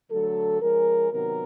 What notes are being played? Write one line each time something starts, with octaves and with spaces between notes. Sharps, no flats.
D3 F#3 A3 A4
F3 G#3 C#4 A#4
C3 D#3 F#3 B3 A#4